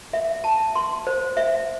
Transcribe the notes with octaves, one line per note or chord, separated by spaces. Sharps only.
E5
A5
C6
C5
E5